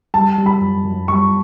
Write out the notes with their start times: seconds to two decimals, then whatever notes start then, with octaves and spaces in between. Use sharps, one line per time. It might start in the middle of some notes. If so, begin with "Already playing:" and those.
0.14 G3 A5
0.38 G3
0.46 B5
0.61 F#2
0.85 F#2
1.08 G3 C#6